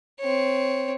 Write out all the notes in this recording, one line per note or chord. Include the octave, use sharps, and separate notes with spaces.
C4 C#5